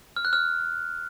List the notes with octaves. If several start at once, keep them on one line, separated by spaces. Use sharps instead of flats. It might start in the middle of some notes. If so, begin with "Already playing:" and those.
F6
F#6
F6